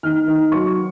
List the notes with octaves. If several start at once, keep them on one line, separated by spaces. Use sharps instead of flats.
D#3 F6
D#3
F#3 C#6